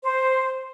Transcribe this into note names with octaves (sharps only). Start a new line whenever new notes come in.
C5